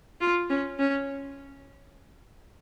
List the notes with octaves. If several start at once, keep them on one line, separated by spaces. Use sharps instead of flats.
F4
C#4
C#4